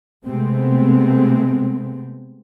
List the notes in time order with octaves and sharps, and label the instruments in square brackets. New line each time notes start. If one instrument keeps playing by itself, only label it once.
[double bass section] C3 G#3 A3 B3 C4